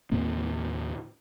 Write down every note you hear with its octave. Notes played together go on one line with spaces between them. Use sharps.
D#2 A2 A#3 C4